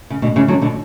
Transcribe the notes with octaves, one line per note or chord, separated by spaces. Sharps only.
C#3
B2 D3
C#3 E3
D3 F#3
B2 D3